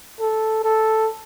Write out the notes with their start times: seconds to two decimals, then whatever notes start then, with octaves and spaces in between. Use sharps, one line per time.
0.20 A4
0.64 A4